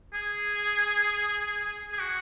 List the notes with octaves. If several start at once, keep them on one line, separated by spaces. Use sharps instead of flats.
G#4
G#4
F#4